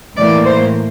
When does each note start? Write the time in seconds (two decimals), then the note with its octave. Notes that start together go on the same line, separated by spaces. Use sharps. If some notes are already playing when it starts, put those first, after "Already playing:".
0.16 A2 E3 A#3 D5
0.45 C5